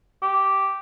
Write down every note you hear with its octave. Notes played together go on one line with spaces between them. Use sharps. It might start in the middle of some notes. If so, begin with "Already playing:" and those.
G4